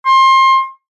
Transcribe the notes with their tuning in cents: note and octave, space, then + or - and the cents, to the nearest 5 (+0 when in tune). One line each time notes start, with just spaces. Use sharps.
C6 +30